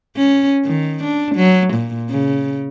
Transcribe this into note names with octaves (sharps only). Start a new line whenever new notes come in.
C#4
D#3
D4
F#3
A#2
C#3